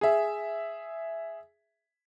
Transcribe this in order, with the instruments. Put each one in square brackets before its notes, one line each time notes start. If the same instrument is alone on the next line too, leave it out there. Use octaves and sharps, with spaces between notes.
[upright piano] G#4 E5